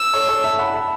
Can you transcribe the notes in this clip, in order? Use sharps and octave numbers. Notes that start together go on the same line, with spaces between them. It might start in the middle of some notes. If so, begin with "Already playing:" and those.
Already playing: E6
A4 C#5
A4 C#5
E5 A5
F#5 B5
E5 A5